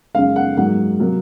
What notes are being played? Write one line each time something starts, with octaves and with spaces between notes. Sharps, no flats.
F#2 C#3 G#3 F5
F#5
G#2 F#3 A#3 F#5
C3 F#3 A#3